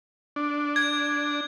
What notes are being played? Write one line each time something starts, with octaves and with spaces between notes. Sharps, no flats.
D4
G#6